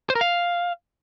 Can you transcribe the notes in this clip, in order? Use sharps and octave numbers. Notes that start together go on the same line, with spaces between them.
C5
A#4
F5